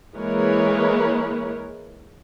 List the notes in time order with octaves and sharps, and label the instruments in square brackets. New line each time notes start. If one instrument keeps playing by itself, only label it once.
[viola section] E3 G#3 A#3 A#4 B4 C#5